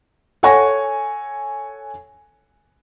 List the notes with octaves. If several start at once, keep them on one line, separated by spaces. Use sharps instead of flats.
A4 C#5 F#5 G#5 C#6 A#6